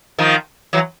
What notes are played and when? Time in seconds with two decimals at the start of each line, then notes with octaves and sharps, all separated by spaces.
0.18 D#3 F3
0.73 E3 F#3